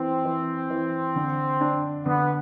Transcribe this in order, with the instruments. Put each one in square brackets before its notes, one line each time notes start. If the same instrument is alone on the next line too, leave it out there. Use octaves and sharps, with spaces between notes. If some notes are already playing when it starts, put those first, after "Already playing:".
Already playing: [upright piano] E3 [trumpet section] C4
[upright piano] E3
E3
D3
D4
[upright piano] D3 [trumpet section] B3